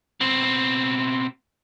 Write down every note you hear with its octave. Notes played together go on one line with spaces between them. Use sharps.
B2 C4